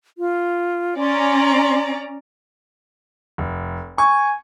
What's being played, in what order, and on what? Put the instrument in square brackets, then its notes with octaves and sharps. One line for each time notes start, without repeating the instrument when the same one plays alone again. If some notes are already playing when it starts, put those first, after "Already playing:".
[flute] F4
[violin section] C#4 D5 A#5 [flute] C6
[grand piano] F1
[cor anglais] G#5 [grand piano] C#6